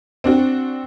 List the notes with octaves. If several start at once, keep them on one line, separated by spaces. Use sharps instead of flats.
C4 D4 F#4